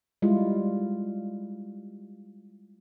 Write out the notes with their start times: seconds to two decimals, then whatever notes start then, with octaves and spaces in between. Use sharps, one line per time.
0.22 G3 G#3 E4 F4